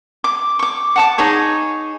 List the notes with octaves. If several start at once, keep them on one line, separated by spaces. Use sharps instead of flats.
D6
C#6 D6
F#5 A5 D6
D#4 G#4 C#5 G#5